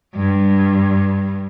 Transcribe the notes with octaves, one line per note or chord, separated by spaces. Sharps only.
G2